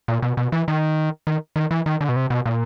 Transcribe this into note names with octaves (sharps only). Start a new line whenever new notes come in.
A#2
B2
B2
E3
D#3
D#3
D#3
E3
D#3
D3
B2
C3
B2
A#2